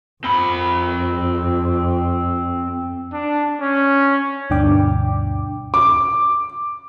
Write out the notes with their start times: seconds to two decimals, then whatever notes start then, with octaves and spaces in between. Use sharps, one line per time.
0.24 F2 C4 B5
3.13 D4
3.61 C#4
4.50 D2 G2 B2 D4 G5 D6
5.74 D6